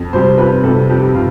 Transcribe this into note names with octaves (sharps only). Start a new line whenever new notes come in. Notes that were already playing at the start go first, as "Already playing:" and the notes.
Already playing: F2
C3 G3 C5
F2 B4
C3 G3 A4
F2 G4
C3 F4